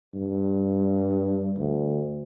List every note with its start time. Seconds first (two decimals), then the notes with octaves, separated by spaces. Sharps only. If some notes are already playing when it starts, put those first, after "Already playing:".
0.15 G2
1.57 D2